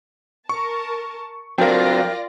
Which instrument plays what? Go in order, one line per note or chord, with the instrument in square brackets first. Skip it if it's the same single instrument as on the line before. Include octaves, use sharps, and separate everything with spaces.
[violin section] A#4 A5 [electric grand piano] C#6
[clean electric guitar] F#3 C4 D4 [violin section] F4 D5 A#6 [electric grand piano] A#4 G5